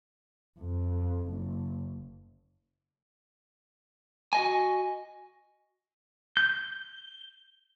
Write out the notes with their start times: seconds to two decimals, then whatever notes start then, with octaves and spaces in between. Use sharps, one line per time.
0.60 F2
1.28 F#1
4.33 F#4 D#5 G#5
6.37 G6